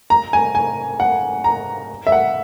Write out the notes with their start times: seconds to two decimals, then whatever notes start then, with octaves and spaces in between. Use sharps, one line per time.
0.10 A#5
0.33 G#5
0.55 G#5
1.00 F#5
1.44 A#5
2.07 E5
2.12 F#5